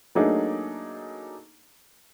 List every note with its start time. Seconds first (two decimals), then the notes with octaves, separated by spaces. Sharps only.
0.15 F#3 A3 A#3 D4 D#4 G#4